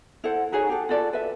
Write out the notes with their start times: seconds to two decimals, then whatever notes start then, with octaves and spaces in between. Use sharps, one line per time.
0.24 E4 A4 C5 F#5
0.52 D#4 F#4 G#4 C#5
0.69 G4 A4
0.89 F4 F#4 A4 D5
1.13 B4 E5